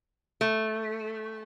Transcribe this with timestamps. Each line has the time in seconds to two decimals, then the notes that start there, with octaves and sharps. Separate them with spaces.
0.41 A3